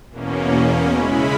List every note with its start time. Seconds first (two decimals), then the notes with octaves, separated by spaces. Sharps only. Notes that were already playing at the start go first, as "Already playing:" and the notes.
0.10 E2 B2 A#3 C#4
0.94 C#3 G#3 C#4 E4 B5